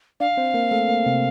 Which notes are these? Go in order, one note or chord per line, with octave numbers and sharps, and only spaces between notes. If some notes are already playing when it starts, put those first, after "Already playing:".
D4 D5 F5
C4 C5
A#3 A#4
A3 A4
A#3
C3 C4